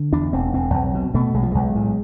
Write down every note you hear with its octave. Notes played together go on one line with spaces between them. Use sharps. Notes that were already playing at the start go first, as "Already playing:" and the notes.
Already playing: D3
E2 D4
E1 C4
E1 C4
B1
B2
B2 A3
B1 G#3
F3
B1 G#3
A2